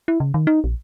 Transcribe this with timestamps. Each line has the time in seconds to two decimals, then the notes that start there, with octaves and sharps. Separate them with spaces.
0.08 E4
0.20 C#3
0.34 D#3
0.47 D#4
0.64 A#1